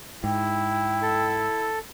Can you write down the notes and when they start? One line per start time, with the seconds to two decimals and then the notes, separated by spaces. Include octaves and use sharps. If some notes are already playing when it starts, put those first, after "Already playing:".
0.24 G#2 E4 G5
1.02 A4